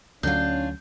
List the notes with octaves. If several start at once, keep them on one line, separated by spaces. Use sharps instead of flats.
D2 D3 F#3 C#4 D4 F4 G6